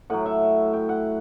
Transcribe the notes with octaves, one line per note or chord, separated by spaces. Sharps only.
A2 F#3 F#5
E5
G5
F#5